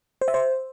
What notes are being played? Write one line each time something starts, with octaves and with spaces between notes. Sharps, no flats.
C5
E5
C5